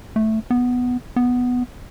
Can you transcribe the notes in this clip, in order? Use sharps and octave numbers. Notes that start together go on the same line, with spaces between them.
A3
B3
B3